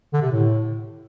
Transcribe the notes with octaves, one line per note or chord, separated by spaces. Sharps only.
D3
C3
A2